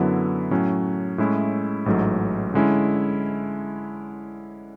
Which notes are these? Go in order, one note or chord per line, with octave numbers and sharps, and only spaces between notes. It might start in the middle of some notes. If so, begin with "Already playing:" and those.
Already playing: F#2 D3 F#3 B3 E4
A2 F#3 C#4
A2 G#3 C#4 E4
A1 G#2 F#3 A3
D3 G#3 C#4 E4